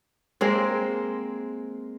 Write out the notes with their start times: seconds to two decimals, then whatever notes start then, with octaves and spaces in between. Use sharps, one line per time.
0.41 G#3 A#3 C4